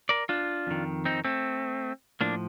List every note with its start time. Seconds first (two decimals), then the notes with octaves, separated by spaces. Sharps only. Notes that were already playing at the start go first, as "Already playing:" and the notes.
0.09 A#4 D5
0.29 D4 F4
0.67 F2 D#3
1.05 C4 D#4
1.25 A3 C4
2.21 A2 F3 A#3 D4